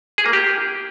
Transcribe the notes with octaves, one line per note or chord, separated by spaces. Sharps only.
G#4
A#3
G4